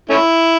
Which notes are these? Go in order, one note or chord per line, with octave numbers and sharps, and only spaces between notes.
A3 C#4 E4